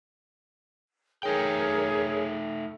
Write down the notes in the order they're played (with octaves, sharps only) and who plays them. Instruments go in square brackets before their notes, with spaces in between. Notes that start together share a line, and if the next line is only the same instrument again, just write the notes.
[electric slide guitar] A3 D#4 G5 [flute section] G#4 A#4 C#5